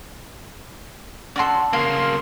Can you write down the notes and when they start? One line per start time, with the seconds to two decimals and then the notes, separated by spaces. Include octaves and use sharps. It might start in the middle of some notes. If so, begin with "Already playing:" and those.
1.36 C#4 F#4 A4 D5 C6
1.73 C#3 A#3 F5 C6